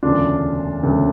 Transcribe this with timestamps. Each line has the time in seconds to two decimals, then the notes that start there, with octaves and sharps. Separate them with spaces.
0.03 E1 D2 C#3 D4 F4
0.83 E1 D2 C#3